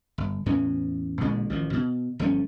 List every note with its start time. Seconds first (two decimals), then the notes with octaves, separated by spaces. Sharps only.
0.18 G1
0.46 E2 A2 E3 C#4
1.21 A1 A#2 D3 G#3
1.50 A1 D#3 F3
1.73 B2
2.19 G1 F3 A3 C#4